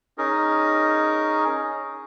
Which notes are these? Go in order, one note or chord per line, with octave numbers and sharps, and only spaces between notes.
C#4 D#4 G#4 A#4